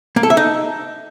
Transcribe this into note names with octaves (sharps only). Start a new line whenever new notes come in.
A#3
A4
E5
D#4